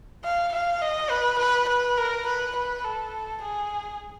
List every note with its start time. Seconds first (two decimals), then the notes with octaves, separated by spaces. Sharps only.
0.24 F5
0.53 F5
0.81 D#5
1.10 B4
1.39 B4
1.70 B4
1.98 A#4
2.28 B4
2.56 B4
2.85 A4
3.42 G#4